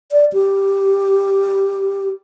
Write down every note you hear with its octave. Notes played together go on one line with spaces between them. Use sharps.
D5
G4